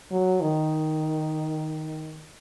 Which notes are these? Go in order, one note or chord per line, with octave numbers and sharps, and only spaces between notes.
F#3
D#3